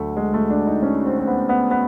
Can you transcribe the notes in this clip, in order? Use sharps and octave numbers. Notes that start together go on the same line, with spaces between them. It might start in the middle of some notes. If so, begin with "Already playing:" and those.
Already playing: D2 D3 F#3 A3
G#3
A3
D4
D#4
C#4
C4
C4
B3
B3
B3